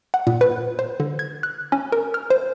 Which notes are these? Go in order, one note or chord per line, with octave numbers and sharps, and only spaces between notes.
F#5
A#2
B4
C5
D3
G#6
F#6
C#4
A#4
F6
C5